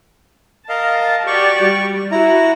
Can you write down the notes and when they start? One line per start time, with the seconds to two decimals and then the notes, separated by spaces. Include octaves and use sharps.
0.69 A#4 D#5 F5 A5
1.27 F#4 G4 D5 C#6
1.63 G3
2.12 E4 F#4 A#5